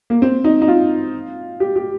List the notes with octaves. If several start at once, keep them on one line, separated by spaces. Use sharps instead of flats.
A#3
C4
D#4
D#4
F4
G4
G4